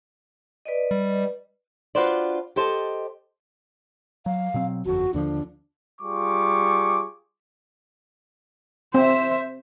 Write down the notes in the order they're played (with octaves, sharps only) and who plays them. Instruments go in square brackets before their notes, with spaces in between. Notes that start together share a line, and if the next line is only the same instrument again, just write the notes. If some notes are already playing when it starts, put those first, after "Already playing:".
[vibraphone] B4 D5 D#5
[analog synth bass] G3
[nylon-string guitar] D4 F4 F#4 B4 C5 D5
G4 A4 C5 D#5 A5
[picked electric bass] F#3 [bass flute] F5
[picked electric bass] B2 F#3 C4
[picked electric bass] G1 F2 [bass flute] F#4
[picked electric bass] D#2 D3 F3 [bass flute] D4
[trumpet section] G3 F4 G#4 C#6 D6
[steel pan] C4 [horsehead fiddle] C5 E5